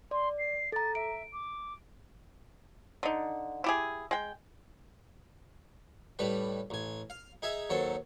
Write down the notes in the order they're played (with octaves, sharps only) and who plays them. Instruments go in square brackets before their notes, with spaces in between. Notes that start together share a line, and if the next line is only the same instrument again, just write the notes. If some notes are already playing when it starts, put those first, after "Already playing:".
[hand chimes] D5 [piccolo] C6
[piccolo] C7
[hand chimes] A4 A#5 [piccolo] A6
[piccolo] E5 [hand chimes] D7
[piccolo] D6
[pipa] D3 D#4
E4 G4 G#4
G#3 G5
[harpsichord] A2 G3 B4
A1 G#5
F5
D#4 G#4 E5
D#2 F#3 A4 C5